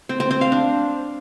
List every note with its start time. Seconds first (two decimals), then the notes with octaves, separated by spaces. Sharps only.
0.09 C4
0.20 C4
0.31 C4
0.41 F5
0.52 D4